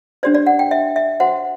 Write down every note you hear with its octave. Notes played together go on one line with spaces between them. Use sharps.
D4 G4 C5 D5
D5
F#5
G5
E5
E5
F#4 C5 F#5